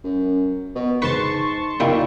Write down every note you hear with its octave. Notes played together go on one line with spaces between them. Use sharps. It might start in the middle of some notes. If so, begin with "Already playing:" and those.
F#2
B2
G#2 B4 A5 C6 C#6
A#2 G3 D#4 E4